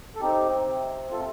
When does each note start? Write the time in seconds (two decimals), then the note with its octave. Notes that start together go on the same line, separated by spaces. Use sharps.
0.16 A4
0.20 C4 D#4 G4
0.66 C3
1.11 C3 F4 A4